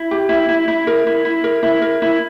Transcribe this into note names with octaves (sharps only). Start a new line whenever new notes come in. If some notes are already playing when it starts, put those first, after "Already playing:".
Already playing: E4
G4
E4
E4
E4
A#4
E4
E4
A#4
E4
A#4
E4